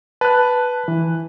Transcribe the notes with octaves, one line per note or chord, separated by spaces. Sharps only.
B4 A5 F#6
E3